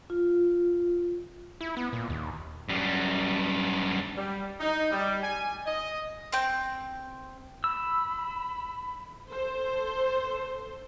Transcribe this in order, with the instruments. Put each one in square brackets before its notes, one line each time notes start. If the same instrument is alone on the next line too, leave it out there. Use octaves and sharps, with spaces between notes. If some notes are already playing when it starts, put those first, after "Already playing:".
[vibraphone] F4
[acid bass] E4
B3
A#2
D#2
[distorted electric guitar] F#2 G3
[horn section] G3
D#4
G3
G#5
D#5
[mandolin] C4 G5
[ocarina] B5 [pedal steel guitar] E6
[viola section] A4 C5